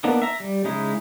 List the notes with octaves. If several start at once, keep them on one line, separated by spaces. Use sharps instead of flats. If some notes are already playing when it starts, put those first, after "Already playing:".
A#3 B3 D4 D#4
E5 A#5
G3
C#3 G#3 D#4 E4